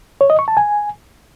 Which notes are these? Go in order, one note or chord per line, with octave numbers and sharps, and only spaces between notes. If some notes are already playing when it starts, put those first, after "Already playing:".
C#5
D#5
C#6
A5
G#5